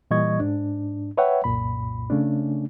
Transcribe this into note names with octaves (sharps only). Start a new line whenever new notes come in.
A#2 E3 G3 D#5 C#6 G#6
G#2 D4
B4 C#5 E5 F#5 G5
C2 F#2 A#2 B5
C#3 A3 C#4 D4